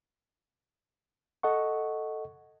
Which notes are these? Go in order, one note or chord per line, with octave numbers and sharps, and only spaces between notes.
A4 D#5 F#5 C#6